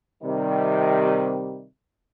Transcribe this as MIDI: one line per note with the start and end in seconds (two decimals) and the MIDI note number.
0.24 1.64 48
0.24 1.64 51
0.24 1.64 55